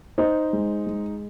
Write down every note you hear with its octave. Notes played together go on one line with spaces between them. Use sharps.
D#4 C5
G#3
G#3